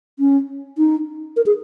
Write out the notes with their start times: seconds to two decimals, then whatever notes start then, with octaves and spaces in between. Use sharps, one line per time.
0.19 C#4
0.78 D#4
1.37 A#4
1.46 G#4